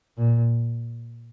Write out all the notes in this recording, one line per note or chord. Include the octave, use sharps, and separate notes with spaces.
A#2